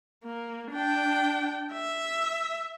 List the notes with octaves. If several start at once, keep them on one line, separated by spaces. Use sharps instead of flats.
A#3
D4 G5
E5